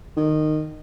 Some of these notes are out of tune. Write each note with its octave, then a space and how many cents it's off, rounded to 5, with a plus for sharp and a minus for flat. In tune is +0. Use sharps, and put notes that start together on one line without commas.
D#3 -15